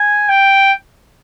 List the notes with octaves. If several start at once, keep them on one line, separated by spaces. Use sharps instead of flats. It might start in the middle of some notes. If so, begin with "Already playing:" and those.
Already playing: G#5
G5